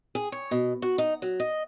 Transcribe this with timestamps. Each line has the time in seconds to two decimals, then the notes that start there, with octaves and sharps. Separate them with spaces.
0.15 G#4
0.32 C#5
0.51 B2
0.82 F#4
0.98 D#4
1.22 F#3
1.40 D#5